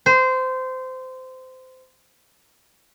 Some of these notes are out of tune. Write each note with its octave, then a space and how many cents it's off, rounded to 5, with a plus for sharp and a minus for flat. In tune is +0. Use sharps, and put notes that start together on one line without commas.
C5 -20